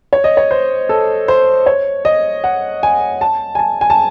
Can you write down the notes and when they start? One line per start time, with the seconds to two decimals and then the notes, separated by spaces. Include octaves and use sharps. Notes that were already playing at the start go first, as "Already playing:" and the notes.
0.13 C#5
0.24 D#5
0.37 C#5
0.51 C5
0.89 A4
1.28 C5
1.66 C#5
2.05 D#5
2.44 F#5
2.83 G#5
3.21 A5
3.55 G#5
3.59 A5
3.81 G#5
3.90 A5